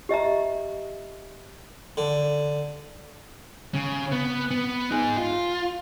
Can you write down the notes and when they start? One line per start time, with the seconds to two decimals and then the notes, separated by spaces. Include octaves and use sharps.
0.09 G4 D#5 E5 A#5
1.97 D3
3.74 C#3
4.12 B3
4.51 B3
4.91 D#4 G#4
5.17 F4